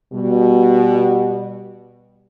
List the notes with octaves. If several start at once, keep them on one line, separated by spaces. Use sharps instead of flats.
B2 G3